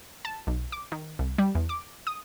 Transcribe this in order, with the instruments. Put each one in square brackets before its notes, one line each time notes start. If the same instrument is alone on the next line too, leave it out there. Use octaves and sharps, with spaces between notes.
[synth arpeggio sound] A5
B1
D6
D#3
C2
G3
E2
D6
D#6